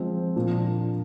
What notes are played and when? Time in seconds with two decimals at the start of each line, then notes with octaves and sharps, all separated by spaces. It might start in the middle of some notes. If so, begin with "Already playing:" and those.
Already playing: F3 G#3 C4
0.36 A#2 F3 A#3 D4